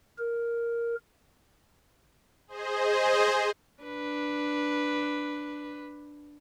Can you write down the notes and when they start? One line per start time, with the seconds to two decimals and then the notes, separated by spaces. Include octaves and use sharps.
0.18 A#4
2.48 G#4 C5 D#5
3.83 D4 B4